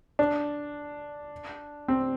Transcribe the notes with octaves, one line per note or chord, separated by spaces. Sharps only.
D4
C4